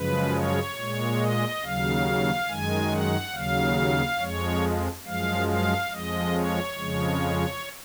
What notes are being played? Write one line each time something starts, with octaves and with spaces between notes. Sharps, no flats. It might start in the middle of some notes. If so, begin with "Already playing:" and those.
Already playing: F#2 C#3 F3 G#3 B4
C#5
A#2 G#3
D#5
D#2 C#3 F#3 F5
F#2 D#3 G#3 G#5
F#5
D#2 C#3 F#3 F5
F2 F3 G#3 C#5
F#2 F3 G#3 F5
F5
F2 F3 G#3 D#5
C#5
F2 C#3 F3 G#3